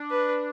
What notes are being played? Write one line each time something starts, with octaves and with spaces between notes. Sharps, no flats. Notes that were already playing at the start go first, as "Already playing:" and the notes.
Already playing: D4
B4